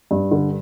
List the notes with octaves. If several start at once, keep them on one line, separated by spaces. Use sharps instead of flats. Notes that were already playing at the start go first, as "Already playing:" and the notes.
G2
D3